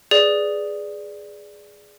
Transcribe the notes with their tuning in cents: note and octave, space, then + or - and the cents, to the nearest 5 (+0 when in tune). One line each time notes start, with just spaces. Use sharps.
G#4 +0 B4 +0 D5 +0